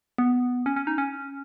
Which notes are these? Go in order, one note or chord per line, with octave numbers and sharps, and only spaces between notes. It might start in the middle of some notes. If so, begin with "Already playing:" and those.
B3
C#4
C#4
D#4
C#4